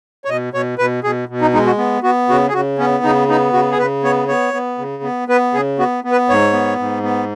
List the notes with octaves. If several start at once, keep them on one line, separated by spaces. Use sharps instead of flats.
C#5
B2 D#5
B2 C#5
B2 B4
B2 G#4
B2
D#4
G#3 D#4
F#4
B3
B3 F#4
C#3 F#4
G#4
C#3 F#4
B3 C#4
C#3 D#4
B3 D#4
C#3 F#4
G#4
C#3 B4
B3 C#5
B3 C#5
B3
C#3
B3
B3 B4
C#3 G#4
B3 F#4
B3
B4
G#2 C#5
B3
G#2
B3